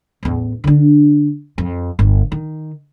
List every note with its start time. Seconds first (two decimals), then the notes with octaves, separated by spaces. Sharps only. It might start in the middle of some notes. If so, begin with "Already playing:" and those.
0.23 A1 E2
0.64 D3 D4
1.58 F2
1.99 G1
2.32 D#3